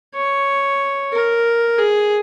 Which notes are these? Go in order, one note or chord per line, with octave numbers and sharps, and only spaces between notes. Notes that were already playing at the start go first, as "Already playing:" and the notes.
C#5
A#4
G#4